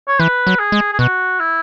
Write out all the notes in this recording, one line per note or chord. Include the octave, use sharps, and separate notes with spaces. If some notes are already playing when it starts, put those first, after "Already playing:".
C#5
E3 B4
F#3
G#4
G#3
G#4
B2 F#4
E4